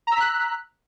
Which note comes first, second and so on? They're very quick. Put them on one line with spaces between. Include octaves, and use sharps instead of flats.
A#5 E6 B6 F#6